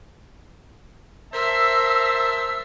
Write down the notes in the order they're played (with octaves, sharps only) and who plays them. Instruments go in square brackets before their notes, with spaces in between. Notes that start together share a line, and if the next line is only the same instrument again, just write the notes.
[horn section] A#4 C5 A5 [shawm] E5 [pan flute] E6